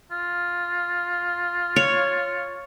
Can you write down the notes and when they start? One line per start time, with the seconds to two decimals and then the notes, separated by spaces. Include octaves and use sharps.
0.11 F4
1.76 C#5